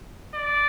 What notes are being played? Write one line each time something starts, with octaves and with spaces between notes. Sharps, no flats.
D5